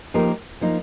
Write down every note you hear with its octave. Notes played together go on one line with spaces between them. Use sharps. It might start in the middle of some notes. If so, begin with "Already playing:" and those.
F3 A#3 D#4 G4 A#4
F3 A#3 D#4